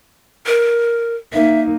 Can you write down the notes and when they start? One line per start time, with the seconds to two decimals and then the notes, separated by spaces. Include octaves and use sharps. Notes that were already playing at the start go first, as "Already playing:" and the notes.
0.46 A#4
1.33 A#3 D#4 E5